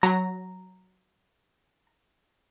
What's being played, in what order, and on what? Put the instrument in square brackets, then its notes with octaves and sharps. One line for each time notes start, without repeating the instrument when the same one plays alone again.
[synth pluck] F#3 A#6 [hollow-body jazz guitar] A#5